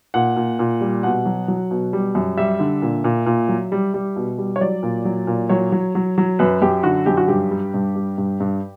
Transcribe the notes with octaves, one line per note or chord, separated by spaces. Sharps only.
A#2 F#5
A#2
A#2
G3
B2 F#5
F#3
F#3
B2
G3
F#2
G3 E5
D3
A#2
A#2
A#2
F#3
G3
G3
B2
G3
C#5
F#3 D5
A#2
F#3
A#2
F#3 C#5
F#3
F#3
F#3
F#2 B4
F#2 G4
D3 F#4
F#2 G4
F#4
G2 G4
G3
G2
G3
G2
G2